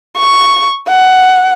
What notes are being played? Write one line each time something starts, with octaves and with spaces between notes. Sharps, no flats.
C#6
F#5